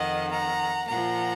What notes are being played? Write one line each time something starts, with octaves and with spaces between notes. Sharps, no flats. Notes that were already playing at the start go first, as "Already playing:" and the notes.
Already playing: F2 D#3 D#5 F#5
F#5 A#5
A#2 F3 F#5 A#5